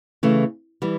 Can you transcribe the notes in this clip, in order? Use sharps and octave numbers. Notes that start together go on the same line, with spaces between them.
C#3 E3 A3
E3 G3